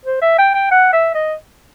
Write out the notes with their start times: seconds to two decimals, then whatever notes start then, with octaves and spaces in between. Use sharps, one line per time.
0.05 C5
0.22 E5
0.38 G5
0.54 G5
0.71 F#5
0.93 E5
1.15 D#5